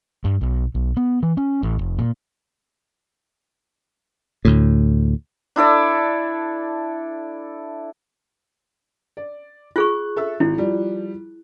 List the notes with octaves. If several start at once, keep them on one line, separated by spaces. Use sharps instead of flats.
G2
B1
B1
B3
E3
C#4
A1
F1
A#2
D2 A2
D4 E4 A4 D5
D5
F4 G#4 C#6 F#6
A4 E5 E6
G#1 E4
F3 G3